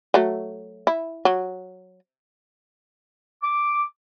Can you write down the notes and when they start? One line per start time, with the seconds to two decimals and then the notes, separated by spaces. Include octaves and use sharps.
0.14 F#3 A3
0.87 E4
1.25 F#3
3.43 D6